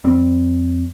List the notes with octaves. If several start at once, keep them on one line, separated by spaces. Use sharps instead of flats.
F2 G3 C4